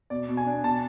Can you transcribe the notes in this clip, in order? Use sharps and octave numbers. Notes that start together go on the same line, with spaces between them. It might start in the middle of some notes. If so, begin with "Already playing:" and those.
B2 D5
B2
G#5
D4
B2 A5